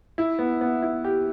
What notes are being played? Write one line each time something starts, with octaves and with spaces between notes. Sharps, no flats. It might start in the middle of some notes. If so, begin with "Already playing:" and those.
E4
B3
B3
E4
G4